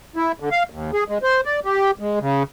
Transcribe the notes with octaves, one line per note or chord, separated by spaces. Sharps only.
E4
D3
F5
D#2
G#4
G#3
C5
D5
G4
G#3
C#3